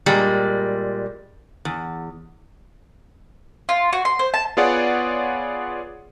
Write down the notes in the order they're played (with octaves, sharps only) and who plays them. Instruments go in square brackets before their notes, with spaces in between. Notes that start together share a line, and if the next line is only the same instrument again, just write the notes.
[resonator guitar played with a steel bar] A#2 G3 G#3
E2
[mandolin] F4
F#4
C6
C5
A5
[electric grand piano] B3 F4 G#4 C#5 D5 F#5